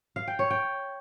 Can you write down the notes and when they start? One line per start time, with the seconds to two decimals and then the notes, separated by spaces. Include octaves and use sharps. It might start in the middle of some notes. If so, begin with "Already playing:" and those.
0.16 F5
0.28 G5
0.39 C#5
0.50 G5